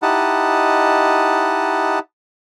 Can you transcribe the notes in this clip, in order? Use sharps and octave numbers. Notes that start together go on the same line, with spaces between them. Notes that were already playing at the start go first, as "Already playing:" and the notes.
D#4 E4 G4 D#5 F#5 A5